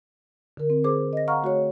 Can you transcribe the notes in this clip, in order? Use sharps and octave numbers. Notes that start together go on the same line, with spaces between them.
D3 A#4
C4
G#4 C5 D6
D#5 A#6
F5 F#5 A#5 C#6 F6
A3 F#4 G#4 C#5